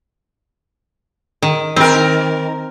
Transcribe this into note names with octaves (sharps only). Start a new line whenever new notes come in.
D#3
D#3 C4 A#4